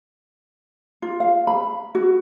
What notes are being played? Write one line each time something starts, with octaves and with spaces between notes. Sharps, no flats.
F4
F5
B5
F#4